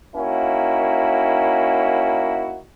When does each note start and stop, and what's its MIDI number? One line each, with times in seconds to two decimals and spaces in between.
0.16 2.61 58
0.16 2.61 61
0.16 2.61 63
0.16 2.61 64
0.16 2.61 66